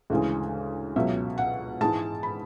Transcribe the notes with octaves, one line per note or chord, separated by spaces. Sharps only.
D2 C#3 E3 G#3
C#2 B2 F#3 E5
F#5
G#2 E3 G#3 A5
B5